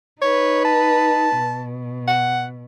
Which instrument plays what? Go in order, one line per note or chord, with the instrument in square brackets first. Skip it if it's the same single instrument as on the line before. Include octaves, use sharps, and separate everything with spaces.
[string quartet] D#4 B4 [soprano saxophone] C#5
[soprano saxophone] A5
[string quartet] B2
[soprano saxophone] F#5